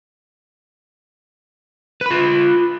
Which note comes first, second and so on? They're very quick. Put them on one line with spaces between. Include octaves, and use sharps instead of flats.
B4 B5 F4